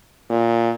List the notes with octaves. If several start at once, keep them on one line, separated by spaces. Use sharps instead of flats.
A#2